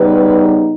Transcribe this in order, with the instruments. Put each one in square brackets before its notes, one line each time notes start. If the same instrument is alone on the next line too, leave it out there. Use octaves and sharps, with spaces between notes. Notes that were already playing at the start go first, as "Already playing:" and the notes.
Already playing: [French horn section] C#3 G3 B3 D#4 B4